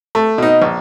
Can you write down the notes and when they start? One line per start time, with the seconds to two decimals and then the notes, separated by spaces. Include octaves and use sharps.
0.15 A3
0.38 B2 D#4
0.62 A#1